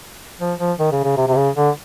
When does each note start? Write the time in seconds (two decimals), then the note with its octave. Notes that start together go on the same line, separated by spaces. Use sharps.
0.40 F3
0.59 F3
0.79 D#3
0.92 C#3
1.04 C#3
1.17 C3
1.28 C3
1.36 C#3
1.56 D3